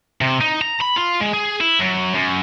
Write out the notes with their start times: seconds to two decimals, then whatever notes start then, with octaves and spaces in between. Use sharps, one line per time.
0.21 C3
0.41 D#4
0.62 A#5
0.81 B5
0.98 F4
1.21 G#3
1.33 G#4
1.60 E4
1.79 F#2
2.14 F#2